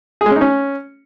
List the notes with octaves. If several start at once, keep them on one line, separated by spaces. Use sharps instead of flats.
G#4
G#3
C#4
D#4
C#4